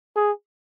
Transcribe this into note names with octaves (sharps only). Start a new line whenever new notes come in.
G#4